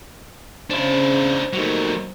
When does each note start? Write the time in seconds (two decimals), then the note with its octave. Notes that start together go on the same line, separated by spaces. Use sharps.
0.70 C#3 D4 E4 C5
1.53 F#3 G3 A3 A#3 D#4